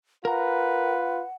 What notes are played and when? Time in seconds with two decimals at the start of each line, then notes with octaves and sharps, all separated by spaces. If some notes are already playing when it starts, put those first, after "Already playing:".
0.25 F4 A#4 B4 F#5 A#5